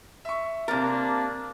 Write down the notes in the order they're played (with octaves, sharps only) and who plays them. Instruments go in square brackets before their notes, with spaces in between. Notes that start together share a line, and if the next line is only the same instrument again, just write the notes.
[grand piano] E5 C#6
[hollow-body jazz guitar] C3 A#4 [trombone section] A#3 D4 [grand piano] A6